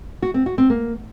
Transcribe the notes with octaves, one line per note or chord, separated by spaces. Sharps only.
F#4
C4
F#4
C4
A#3